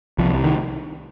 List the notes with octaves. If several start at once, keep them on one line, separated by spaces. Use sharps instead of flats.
C2 F3
D#3